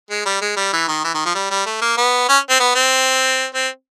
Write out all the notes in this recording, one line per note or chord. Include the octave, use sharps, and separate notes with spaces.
G#3
G3
G#3
G3
E3
D#3
E3
D#3
F3
G3
G3
A3
A#3
B3
C#4
C4
B3
C4
C4